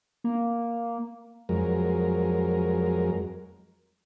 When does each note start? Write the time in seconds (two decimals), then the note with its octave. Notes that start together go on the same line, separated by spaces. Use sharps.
0.24 A#3
1.49 F2 F#3 G#3 A#4